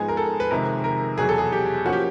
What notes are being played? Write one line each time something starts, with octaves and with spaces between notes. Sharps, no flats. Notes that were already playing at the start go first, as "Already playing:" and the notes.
Already playing: G#2 F3 G#3 B3 G#4
A#4
A4
B4
F2 C3 D#3 G#3 A#4
A#4
E2 B2 F#3 G#4
A4
G#4
G4
F3 A#3 C#4 F#4
G4